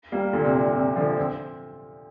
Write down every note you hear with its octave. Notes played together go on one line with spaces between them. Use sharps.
G3 A#3
A#2 D3
C3
A#2
C3
D3 F3
C4